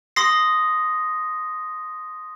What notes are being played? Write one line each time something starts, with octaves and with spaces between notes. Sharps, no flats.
C6 D#6 A#6 C7